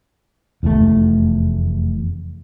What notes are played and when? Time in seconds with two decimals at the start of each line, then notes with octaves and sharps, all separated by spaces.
0.63 F1 E2 G#2 A3